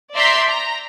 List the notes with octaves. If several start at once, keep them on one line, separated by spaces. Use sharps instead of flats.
D5 E5 A#5 C6 G6 B6
A#5